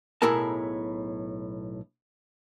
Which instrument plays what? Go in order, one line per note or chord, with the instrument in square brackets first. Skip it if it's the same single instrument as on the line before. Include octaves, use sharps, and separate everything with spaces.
[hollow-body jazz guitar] B1 A2 E4 G#4 A#4 A5